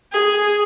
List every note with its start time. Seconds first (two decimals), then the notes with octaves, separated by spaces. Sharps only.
0.12 G#4